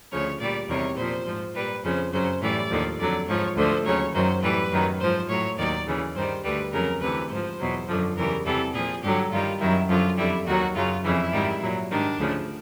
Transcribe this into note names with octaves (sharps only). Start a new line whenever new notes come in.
D2 C#3 F3 C#5
A#2 G3 D5
E2 C3 D#3 G3 C#5
A#2 F3 C5
G#2 F3
A#2 G3 B4
F2 C#3 F3 C5
F#2 C#3 F#3 C5
A2 E3 G3 D5
D#2 D3 F3
F2 D3 F#3 D5
G#2 F3 C#5
D2 D3 F3 C5
D#2 C#3 F#3 C#5
F#2 D#3 F#3 C5
A2 E3 G3 B4
F#2 D#3 F#3
G#2 F3 C5
A2 F#3 C#5
D#2 D#3 F#3 D5
D#2 C#3 E3
G2 D#3 G3 C5
D2 D3 G3 B4
F2 C#3 F#3 A#4
D2 C3 E3 B4
G#2 F3 C5
E2 B2 F#3
F#2 D3 F3
E2 C#3 E3 G3 A#4
E2 C3 E3 G3 A4
A#2 F3 G#4
G2 D3 F#3 G4
G2 D#3 G3 F4
F#2 D#3 F#3 E4
F#2 D3 F3 F4
F2 D3 G3 E4
D#2 D#3 F#3 F#4
F#2 C#3 F#3 F4
F2 C#3 E3 E4
G#2 D#3 G3
A#2 F#3
G#2 D#3 G3 D4
D2 C#3 F3